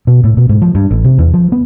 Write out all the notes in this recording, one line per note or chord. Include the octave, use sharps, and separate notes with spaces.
B2
A2
B2
G#2
F3
G2
A1
C3
E2
F3
B3